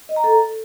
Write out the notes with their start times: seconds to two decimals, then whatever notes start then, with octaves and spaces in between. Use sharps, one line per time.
0.09 D#5
0.16 A#5
0.24 A4